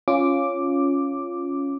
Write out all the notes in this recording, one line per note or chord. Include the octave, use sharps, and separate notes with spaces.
C#4 F4 D6